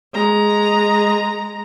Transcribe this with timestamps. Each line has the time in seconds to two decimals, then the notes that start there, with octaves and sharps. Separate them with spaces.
0.13 G#3 A#5